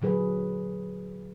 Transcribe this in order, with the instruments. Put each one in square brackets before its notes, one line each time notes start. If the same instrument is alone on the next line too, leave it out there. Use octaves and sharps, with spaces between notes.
[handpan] A#2 D3 F#3 G#4 B4